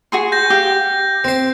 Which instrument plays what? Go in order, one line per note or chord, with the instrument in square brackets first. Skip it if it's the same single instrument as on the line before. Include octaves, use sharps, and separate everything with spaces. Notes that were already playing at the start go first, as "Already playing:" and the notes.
[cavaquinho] F#4 G#4 C6
[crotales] G6 A#6
[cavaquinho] G4 F5
[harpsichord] C4 C5